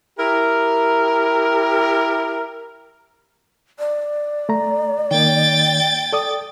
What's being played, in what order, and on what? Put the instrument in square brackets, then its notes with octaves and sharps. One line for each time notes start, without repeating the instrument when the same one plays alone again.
[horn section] E4 G4 A#4
[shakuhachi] D5
[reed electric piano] A3 A#5
[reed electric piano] D#3 A#3 [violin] G5 A6
[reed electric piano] A4 D5 D#6